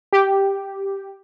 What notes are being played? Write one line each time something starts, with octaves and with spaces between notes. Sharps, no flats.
G4